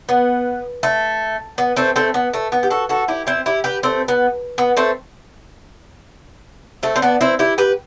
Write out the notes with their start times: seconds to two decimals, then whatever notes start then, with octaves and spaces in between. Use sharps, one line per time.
0.09 B3
0.83 A3
1.58 B3
1.76 A3 C4
1.96 A3 C4
2.14 B3
2.34 A3
2.52 B3
2.63 G4
2.70 F#4 A4
2.89 F#4 A4
3.08 E4 G4
3.27 C4 E4
3.46 E4 G4
3.64 G4 B4
3.83 A3 C4
4.08 B3
4.58 B3
4.77 A3 C4
6.83 A3 C4
6.96 C4
7.02 B3 D4
7.21 C4 E4
7.39 E4 G4
7.58 G4 B4